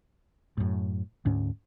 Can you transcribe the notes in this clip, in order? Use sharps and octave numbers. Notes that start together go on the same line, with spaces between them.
F#2 A2
D2 G#2 C#4